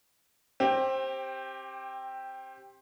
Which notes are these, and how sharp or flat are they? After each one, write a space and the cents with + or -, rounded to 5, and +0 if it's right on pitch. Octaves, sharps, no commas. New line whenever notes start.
C4 +20 G4 +0